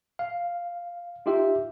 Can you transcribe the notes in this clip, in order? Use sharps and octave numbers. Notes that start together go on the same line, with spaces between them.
F5
D#4 F4 G4 E5